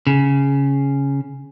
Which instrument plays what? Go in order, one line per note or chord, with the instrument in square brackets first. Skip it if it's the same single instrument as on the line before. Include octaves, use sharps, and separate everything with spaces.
[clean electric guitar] C#3